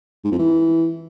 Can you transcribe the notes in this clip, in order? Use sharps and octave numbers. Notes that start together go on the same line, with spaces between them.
G#2
F2
E3